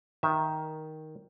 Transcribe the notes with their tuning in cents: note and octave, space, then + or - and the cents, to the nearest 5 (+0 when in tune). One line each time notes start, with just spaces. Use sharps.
D#3 +5 E5 +0